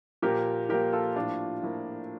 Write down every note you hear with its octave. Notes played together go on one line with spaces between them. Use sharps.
A#2 F3 A#3 G4 A#4
A#2 F3 A#3 G4 A#4
F4 A4
A2 F3 A#3 D4 F4
A2 F3 A#3